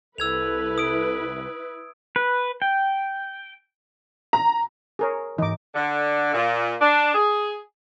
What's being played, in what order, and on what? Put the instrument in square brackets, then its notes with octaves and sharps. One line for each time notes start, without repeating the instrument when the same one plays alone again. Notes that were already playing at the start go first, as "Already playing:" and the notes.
[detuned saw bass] C2 [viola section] E4 B4 [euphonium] A4 [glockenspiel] E6 G#6 F7
[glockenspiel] D#6 D7
[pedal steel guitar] B4
G5
[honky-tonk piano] A#5
[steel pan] G#4 A#4 C#5
[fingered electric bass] G#2 E3 [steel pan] D#4 D6
[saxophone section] D3
A#2
D4
G#4